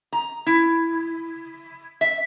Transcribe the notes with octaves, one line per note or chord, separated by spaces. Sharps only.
A#5
E4
E5